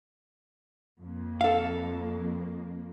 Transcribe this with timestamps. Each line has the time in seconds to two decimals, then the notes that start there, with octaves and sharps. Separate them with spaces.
1.01 F2 A#3
1.41 A4 F5